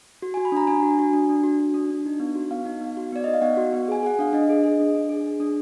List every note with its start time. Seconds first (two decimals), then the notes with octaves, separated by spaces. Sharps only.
0.22 F#4
0.34 G#5
0.37 F#4
0.45 B5
0.52 D4 A#5
0.67 D4 G#5
0.83 F#4
0.99 F#4
1.13 D4
1.29 D4
1.43 F#4
1.59 F#4
1.74 D4
1.90 D4
2.06 D#4
2.20 B3
2.35 F#4
2.51 B3 F5
2.65 D#4
2.81 B3
2.97 F#4
3.12 B3 D5
3.24 D#4 D#5
3.34 F5
3.42 B3 F#5
3.57 F#4
3.73 B3
3.88 G#4 G#5
4.03 G#4 F#5
4.19 D4 F5
4.33 D4 D#5
4.49 G#4
4.64 G#4
4.80 D4
4.95 D4
5.09 G#4
5.24 G#4
5.40 D4